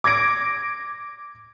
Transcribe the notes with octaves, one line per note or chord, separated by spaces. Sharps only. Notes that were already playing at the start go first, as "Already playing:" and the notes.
D6 G#6 A#6 D7